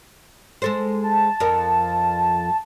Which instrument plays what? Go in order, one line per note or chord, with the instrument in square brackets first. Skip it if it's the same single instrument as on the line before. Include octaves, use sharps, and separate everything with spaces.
[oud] G#3 A4 C5
[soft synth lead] A5
[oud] F2 F3 A#4